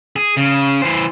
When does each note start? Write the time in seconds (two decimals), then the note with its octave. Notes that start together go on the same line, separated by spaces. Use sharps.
0.16 G#4
0.37 C#3
0.82 E3 C5